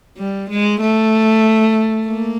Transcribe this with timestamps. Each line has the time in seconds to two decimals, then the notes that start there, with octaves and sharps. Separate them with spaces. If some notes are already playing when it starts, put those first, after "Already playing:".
0.18 G3
0.50 G#3
0.81 A3
2.07 A#3